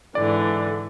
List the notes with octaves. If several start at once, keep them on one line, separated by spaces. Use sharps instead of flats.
G#2 D3 E3 D5